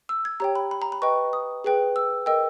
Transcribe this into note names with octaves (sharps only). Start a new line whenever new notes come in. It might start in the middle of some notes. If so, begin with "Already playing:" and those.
E6
G#6
G4 C#5 G5 A#5
B5
B5
A#5
B5
B4 D#5 G5 C#6
D#6
G#4 B4 G5
E6
A#4 D#5 G5 E6